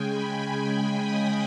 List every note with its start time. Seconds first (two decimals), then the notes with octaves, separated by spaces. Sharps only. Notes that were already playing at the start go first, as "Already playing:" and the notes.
Already playing: C#3 G#3 G5 G#5
0.10 B5
1.00 D#6